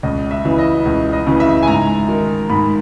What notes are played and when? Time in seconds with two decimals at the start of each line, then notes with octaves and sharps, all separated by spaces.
0.03 C#2 D#5
0.31 E5
0.45 C#3 E3
0.59 D#5
0.86 C#2
1.13 D#5
1.27 C#3 E3
1.40 E5
1.63 G#5
1.68 G#2 A#5
2.09 D#3
2.50 G#2 B5